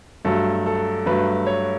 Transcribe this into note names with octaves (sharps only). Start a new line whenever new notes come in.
G2 F#3 A3 A4
A4
G2 F#3 A3 B4
C#5